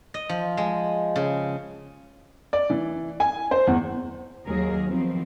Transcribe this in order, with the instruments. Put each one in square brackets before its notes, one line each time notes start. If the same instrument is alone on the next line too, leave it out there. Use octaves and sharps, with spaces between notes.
[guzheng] D#5
F3
G#3
C#3
[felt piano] D5
E3
G#5
C5
E2
[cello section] D#2 F#3 G#4 A#4
D#3 F3 B3 C4